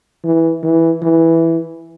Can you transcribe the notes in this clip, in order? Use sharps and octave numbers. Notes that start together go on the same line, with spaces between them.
E3
E3
E3